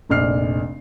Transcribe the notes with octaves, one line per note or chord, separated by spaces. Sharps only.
F1 A#1 D5 F6 C7